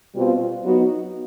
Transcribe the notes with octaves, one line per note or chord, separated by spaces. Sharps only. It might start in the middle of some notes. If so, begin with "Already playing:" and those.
B2 G3 C4 F4
F#3 B3 D#4 F#4